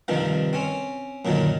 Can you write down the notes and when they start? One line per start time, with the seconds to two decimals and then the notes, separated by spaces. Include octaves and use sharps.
0.08 G2 C3 D#3 F3
0.53 C4 C#4
1.25 F#2 A#2 D3 D#3